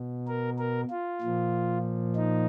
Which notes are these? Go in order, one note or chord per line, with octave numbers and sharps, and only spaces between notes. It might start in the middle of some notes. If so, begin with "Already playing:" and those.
Already playing: B2
A#4
A#4
F4
A#2 F3
D#4